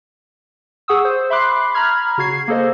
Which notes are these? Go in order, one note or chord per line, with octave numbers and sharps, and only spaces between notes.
G#4 F#5 C#6 D#6 E6
C5
E5 B5 C6 D6 F#6 C7
A#5 B5 F6 G#6
C#3 F#4 G#6 C7
A#3 G#4 A4 C5 D#5